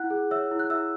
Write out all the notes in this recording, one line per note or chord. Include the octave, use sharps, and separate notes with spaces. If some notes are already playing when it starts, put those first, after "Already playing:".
Already playing: E4 F#5 F#6
G#4
C#5 E5 E6
E4
F#6
E4 E5 E6